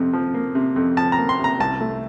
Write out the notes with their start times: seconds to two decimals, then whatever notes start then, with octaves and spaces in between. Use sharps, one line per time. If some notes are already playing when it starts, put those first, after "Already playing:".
Already playing: F2 C3
0.13 F3
0.34 A#3
0.55 C3
0.76 F2
0.97 F3 A5
1.12 A#5
1.18 A#3
1.29 C6
1.39 C3 A#5
1.60 C2 A5
1.81 A3